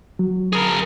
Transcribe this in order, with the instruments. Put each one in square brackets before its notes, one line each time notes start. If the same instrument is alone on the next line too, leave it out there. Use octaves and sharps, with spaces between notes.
[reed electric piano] F#3
[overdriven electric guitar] G#4 A#4